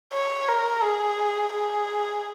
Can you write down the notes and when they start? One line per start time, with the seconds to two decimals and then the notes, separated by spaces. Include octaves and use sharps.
0.13 C#5
0.48 A#4
0.83 G#4
1.53 G#4